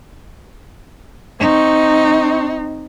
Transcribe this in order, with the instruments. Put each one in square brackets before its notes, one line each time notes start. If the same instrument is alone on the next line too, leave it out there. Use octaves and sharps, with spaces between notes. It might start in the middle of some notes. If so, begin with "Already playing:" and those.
[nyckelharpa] C4 C#6 [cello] D#4